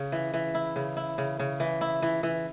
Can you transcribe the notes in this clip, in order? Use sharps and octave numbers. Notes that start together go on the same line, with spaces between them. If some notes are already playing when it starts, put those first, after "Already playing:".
Already playing: C#3
E3
E3
E4
C#3
E4
C#3
C#3
E3
E4
E3
E3